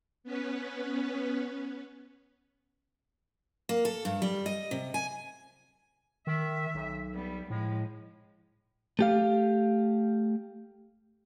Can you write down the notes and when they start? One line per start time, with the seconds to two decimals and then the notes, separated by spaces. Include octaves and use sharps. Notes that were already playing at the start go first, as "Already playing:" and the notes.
0.24 B3 C#4 B4
3.69 A#3
3.85 A4
4.05 G2
4.22 G3
4.46 D#5
4.71 C3
4.94 G#5
6.27 D#3 E5
6.74 B1
7.14 G3 B3
7.50 A2 F3 G#3
8.99 A3 G4 F5